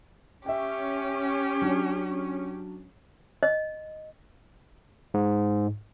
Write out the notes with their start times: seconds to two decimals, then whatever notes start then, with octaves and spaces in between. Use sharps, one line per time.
0.46 C#4 G4 E5 G5
1.62 F#3 D4
3.43 D#5
5.14 G#2